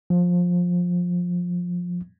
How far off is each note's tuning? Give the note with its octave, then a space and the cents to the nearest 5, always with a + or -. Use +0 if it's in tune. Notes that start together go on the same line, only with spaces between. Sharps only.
F3 +20